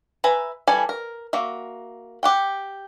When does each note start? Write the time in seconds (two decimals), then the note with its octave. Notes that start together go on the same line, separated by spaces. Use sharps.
0.24 B4 E5 G#5 A#5
0.67 E3 G3 A4 G#5
0.89 A#4
1.33 A#3 F#4 E5
2.23 G4 F#5 G5